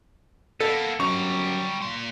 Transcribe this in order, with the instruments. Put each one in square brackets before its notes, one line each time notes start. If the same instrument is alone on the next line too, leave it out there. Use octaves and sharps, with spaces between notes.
[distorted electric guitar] A#3 B3 [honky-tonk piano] A4
[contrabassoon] F#2 [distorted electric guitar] G3 A#5 [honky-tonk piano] C#6
[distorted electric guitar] A#2 C6